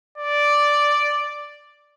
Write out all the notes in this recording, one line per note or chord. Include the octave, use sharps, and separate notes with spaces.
D5